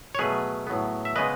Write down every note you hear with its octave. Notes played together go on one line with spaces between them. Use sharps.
C#5
B2 F#3 A3 G#4 B4
A2 F#3 B3
E5
C#3 G#3 B3 B4 D#5